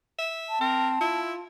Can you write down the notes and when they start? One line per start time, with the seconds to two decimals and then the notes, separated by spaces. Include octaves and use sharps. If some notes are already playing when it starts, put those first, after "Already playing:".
0.19 E5
0.49 A5
0.61 C4 A#4
1.01 E4 F4